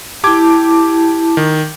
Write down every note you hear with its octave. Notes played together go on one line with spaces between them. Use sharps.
E4 G4 A5 D6 G#6
D#3